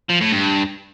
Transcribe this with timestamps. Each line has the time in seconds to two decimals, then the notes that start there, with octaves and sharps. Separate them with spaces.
0.10 F3
0.21 A2
0.32 G2